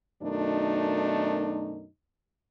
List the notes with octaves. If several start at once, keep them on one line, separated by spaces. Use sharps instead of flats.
F#2 B2 D#3 A3 D4 D#4